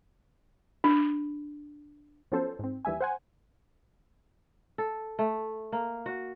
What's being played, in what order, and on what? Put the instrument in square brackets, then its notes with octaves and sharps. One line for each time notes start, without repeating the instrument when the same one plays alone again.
[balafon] D4
[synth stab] F3 F#3 B3 C#4 A4 C5
G#2 C4
D#2 E3 G3 E5 G#5
C5 F#5 G#5
[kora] A4
A3
A#3
F#4